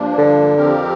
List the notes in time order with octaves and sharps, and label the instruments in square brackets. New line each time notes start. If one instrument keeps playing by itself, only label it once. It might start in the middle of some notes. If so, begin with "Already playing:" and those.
Already playing: [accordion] G2 F3 A#3 D4
[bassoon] D3
[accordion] F2 F3 C4 G4 A#4